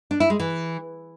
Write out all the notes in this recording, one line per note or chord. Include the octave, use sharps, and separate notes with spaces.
D4
E4
G#3
E3